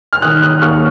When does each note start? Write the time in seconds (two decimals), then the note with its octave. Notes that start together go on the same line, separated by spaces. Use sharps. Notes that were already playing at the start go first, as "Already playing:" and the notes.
0.13 F6
0.22 D#3 D#6 F#6
0.42 D#6 F#6
0.62 D#2 C#6 F6